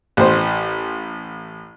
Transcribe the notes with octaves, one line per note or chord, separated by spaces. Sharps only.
A1 C5